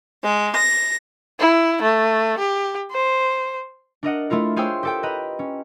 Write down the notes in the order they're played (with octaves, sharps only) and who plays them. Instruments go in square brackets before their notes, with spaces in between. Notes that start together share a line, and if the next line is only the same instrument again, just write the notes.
[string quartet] G#3
A#6
[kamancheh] E4
A3
G4
C5
[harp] D4 A#4 D#5 F#5
A3 E4 F4 A#4
F4 G#4 C5 C#5 G5 E6
G4 A4 G5
B4 D#5 A#5
C#4